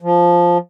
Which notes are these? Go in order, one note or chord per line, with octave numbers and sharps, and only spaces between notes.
F3